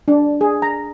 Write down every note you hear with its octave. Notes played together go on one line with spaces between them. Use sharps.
D4
G#4
A#5